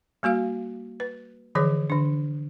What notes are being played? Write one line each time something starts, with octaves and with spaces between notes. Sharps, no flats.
G3 A#3 F#4 F5
B4
D3 E3 F3 G#4 C#5
D3 D4